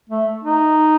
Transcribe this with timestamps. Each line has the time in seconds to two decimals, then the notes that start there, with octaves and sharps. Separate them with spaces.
0.09 A3
0.44 D#4